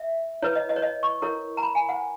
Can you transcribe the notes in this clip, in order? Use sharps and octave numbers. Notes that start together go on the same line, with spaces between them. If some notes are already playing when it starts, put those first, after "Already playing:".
Already playing: E5
E4 B4 C#5
D#5
D#5
C#5
D#5
C#6
E4 A#4 C#5
A#5
B5
G#5
F#5